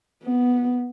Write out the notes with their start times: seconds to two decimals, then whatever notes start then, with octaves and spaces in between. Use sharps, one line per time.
0.24 B3